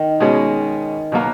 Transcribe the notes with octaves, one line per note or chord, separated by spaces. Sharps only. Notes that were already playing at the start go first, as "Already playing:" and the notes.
Already playing: D#3
B2 G#3 C#4 G#4
B2 F#3 A#3